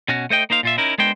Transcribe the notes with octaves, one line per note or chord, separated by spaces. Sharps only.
B2 C#4 F#4
A3 C5 D#5 G5
A#3 D#4 C5 F5
A#2 F4 E5
C#4 D#4 E4 A#4
G#3 B3 D4 A#4 C5 G5